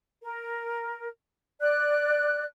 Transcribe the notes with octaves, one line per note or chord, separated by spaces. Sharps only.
A#4
D5 F#6